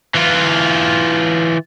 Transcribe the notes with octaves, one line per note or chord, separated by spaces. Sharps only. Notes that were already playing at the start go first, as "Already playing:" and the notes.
E3 F4